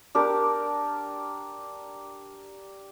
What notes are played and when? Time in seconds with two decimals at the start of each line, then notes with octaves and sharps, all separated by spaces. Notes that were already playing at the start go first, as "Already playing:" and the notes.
0.15 D4 G4 A#4